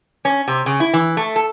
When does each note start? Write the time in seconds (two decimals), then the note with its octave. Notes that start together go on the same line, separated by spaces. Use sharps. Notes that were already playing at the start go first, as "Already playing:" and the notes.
0.25 C#4
0.48 C3
0.66 C#3
0.80 E4
0.93 E3
1.17 A3
1.36 A4